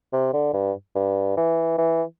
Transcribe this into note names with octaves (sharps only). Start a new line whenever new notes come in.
C3
D3
G2
G2
E3
E3